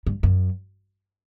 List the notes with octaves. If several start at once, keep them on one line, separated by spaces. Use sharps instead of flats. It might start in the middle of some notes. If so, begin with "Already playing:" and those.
G2
F#2